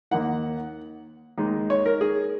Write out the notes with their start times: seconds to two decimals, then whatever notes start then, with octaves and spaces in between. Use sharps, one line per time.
0.11 D#2 D#3 A#3 D#4 F#5
1.38 D#2 D#3 G#3 D#4
1.70 C#5
1.86 A#4
2.01 G#4